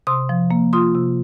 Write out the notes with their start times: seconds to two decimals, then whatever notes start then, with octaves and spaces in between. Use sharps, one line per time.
0.07 C3 C6 D#6
0.29 F3
0.51 A#3
0.73 F4 C6 D#6
0.95 C3